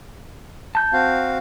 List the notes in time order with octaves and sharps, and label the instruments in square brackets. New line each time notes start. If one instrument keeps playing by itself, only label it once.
[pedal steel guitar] A5 G6
[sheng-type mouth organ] C4 F#4 F5